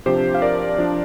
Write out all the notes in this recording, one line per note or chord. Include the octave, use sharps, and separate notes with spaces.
C3 F3 D4 G4 C5
F5
A#4 D5
F3 D4